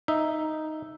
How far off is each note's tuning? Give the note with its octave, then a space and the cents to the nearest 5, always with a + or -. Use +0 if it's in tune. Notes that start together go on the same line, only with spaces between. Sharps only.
D#4 +0 E5 +0